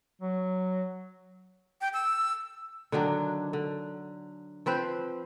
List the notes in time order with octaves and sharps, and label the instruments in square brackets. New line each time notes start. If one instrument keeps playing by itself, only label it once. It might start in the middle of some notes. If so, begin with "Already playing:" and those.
[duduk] F#3
[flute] G5
E6
[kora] D3 D#3 F#3 D4
D3
F3 C4 B4 C5